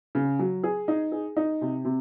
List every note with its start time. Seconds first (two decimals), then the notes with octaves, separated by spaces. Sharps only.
0.15 C#3
0.39 F#3
0.63 G#4
0.88 D#4
1.12 G#4
1.37 D#4
1.61 C3
1.85 C3